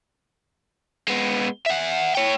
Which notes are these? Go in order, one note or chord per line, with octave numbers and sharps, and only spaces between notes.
G#3 B3
E5 F#5
C#5 G5